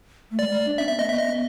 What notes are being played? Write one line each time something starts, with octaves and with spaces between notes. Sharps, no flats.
A3
G#3 D5
A3
D4
C#4 E5
B3 E5
A#3 D#5
B3 E5
D#5